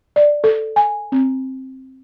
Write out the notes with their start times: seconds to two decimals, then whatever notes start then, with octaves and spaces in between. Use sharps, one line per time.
0.16 D5
0.44 A4
0.76 G#5
1.12 C4